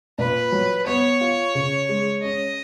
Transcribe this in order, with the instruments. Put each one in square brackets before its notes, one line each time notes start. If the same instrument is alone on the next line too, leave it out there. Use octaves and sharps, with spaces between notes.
[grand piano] A#2 [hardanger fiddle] B4
[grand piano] F#3
[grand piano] B3 [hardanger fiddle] C#5
[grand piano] F4
C#3
G#3
[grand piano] C#4 [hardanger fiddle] D#5